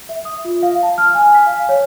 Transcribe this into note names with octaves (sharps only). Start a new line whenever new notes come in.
E5
D#6
F4
F5
A5
F6
G#5
B6
F5
C#5